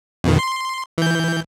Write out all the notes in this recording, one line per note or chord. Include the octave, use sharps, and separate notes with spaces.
F2 B2 D#3
C6
E3 G6